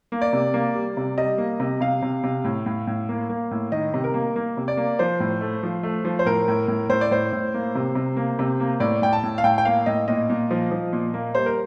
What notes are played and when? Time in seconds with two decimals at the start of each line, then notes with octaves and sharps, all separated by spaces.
0.12 A#3
0.21 D5
0.33 C3
0.54 A#3
0.75 G3
0.97 C3
1.18 G3 D#5
1.38 A#3
1.60 C3
1.80 C3 F5
2.02 C3
2.24 C3
2.44 A2
2.66 A2
2.87 A2
3.09 A#3
3.29 A#3
3.51 A2
3.72 D#3 D#5
3.94 C3
4.04 A#4
4.14 A#3
4.36 A#3
4.57 C3
4.68 D5
4.77 A#3
4.99 F3 C5
5.20 A2
5.41 A3
5.63 F3
5.83 A3
6.05 F3
6.19 C5
6.26 A2 A#4
6.48 A2
6.68 A2
6.89 A2 C5
7.01 D5
7.11 A2 C5
7.33 A2
7.54 A#3
7.75 C3
7.95 C3
8.16 A#3
8.39 C3
8.60 A#3
8.80 A2 D5
9.02 A2 G5
9.13 A5
9.23 A2
9.38 F5
9.44 A2 G5
9.58 G5
9.65 A#3 F5
9.86 A2 D#5
10.08 A#2 D#5
10.30 A#2
10.51 F3
10.71 F3
10.93 A#2
11.14 A#3
11.35 G3 C5
11.46 A#4